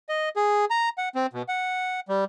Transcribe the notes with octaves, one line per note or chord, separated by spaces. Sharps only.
D#5
G#4
A#5
F#5
C4
B2
F#5
G3